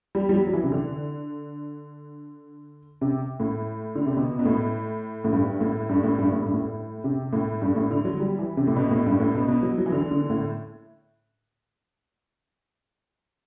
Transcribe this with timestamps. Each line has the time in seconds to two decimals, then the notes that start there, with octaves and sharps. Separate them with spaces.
0.15 G3
0.29 G3
0.33 F#3
0.47 F#3
0.53 E3
0.64 C3
0.72 D3
3.01 C3
3.40 A2
3.95 D3
4.06 C3
4.17 B2
4.39 B2
4.45 A2
5.24 A2
5.33 G2
5.61 A2
5.89 G2
6.04 A2
6.18 G2
6.32 A2
6.43 G2
6.54 A2
7.04 C3
7.33 A2
7.62 G2
7.76 A2
7.91 D3
8.05 F#3
8.20 G3
8.39 E3
8.57 C3
8.67 A2
8.76 B2
8.91 A2
9.06 G2
9.20 A2
9.35 B2
9.48 B2
9.63 F#3
9.78 F#3
9.86 E3
9.92 D3
10.11 D3
10.30 A2